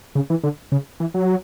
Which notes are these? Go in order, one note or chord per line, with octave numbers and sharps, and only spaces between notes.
C#3
E3
D3
C#3
E3
F#3